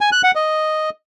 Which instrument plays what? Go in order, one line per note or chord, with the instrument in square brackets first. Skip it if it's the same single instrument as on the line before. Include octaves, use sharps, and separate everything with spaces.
[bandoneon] G#5
F#6
F#5
D#5